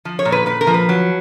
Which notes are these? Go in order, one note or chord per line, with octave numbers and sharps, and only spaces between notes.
F3
C#5
A#2
B4
A#2 B4
A#4
F3
B4
F#3